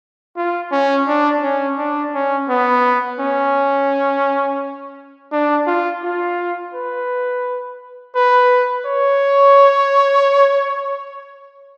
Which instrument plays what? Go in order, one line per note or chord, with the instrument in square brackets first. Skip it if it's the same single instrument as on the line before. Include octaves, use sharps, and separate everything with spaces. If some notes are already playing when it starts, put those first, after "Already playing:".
[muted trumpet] F4
C#4
D4
C#4
D4
C#4
B3
C#4
D4
F4
F4
B4
B4
C#5